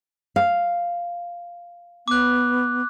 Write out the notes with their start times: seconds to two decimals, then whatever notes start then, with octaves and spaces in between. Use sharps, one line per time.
0.36 F5
2.08 B3 D6 F#6